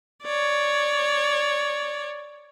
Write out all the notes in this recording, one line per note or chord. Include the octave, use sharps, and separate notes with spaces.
C#5 D5